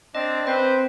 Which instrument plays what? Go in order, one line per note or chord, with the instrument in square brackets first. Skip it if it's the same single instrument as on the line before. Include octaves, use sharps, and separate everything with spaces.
[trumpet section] C4 D4 [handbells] D#5
[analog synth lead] C4 [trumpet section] B4 C5 [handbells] G5